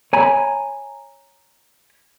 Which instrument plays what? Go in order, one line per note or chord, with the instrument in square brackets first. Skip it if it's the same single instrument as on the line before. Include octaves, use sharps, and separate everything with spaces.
[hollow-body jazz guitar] C#5 G#5 A#5 B5